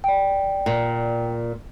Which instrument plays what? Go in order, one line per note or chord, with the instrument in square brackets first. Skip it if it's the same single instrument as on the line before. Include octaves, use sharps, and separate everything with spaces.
[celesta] D5 G5
[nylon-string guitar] A#2